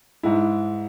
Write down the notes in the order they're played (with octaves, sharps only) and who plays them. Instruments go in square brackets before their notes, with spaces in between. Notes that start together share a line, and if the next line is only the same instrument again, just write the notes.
[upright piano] G#2 G#3 E4